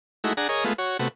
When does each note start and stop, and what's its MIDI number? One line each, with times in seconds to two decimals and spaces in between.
0.24 0.33 56
0.24 0.33 57
0.24 0.33 63
0.24 0.33 64
0.24 0.33 66
0.37 0.48 62
0.37 0.48 68
0.37 0.48 78
0.37 0.48 82
0.49 0.64 68
0.49 0.64 70
0.49 0.64 73
0.49 0.64 75
0.64 0.73 56
0.64 0.73 57
0.64 0.73 59
0.64 0.73 65
0.78 0.97 66
0.78 0.97 73
0.99 1.08 48
0.99 1.08 57
0.99 1.08 59
0.99 1.08 66